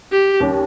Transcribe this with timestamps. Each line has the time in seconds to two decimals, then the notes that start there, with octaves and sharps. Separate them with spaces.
0.12 G4
0.40 D#2 C#3 G3 C#4 G4